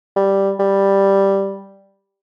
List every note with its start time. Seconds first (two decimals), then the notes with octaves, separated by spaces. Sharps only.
0.16 G3
0.59 G3